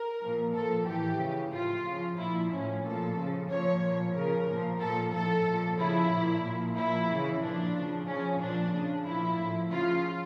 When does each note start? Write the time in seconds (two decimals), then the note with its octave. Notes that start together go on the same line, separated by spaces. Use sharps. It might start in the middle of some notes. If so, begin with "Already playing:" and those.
Already playing: A#4
0.22 A#2 F3
0.55 A#2 F3 A4
0.87 A2 E3 G4
1.20 C#3 E3
1.53 A2 F3 F4
1.86 C#3 F3
2.18 A#2 F3 E4
2.51 A2 F3 C#4
2.84 A#2 F3 A4
3.17 C#3 F3
3.49 A#2 F3 C#5
3.82 A#2 F3
4.14 C#3 F3 A#4
4.48 A#2 F3
4.80 A#2 F3 A4
5.13 A2 F3 A4
5.46 A#2 F3
5.78 C#3 F3 E4
6.11 A#2 F3
6.44 A#2 F3
6.76 A#2 F3 E4
7.09 C#3 E3
7.42 A#2 F3 D4
7.75 C#3 F3
8.07 C#3 F3 C#4
8.40 A#2 F3 D4
8.73 C#3 F3
9.06 A#2 F3 E4
9.39 A2 F3
9.71 C#3 F3 F4